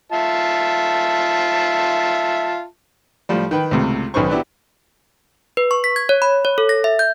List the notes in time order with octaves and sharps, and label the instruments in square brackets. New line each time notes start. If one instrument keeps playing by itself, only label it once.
[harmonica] F4 E5 A5
[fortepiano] A2 F3 G3
D#3 B4 G5
C#2 A2 C3
B1 D#3 C#4 B4 C5 C#6
F#3 B3 D4 E4 G4
[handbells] B4
C#6
B6
G#6
C#5
B5
C#5
A4
A#6
E5
G6